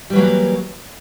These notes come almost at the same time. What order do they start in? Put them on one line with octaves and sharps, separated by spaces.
G3 E3 F#3 A#3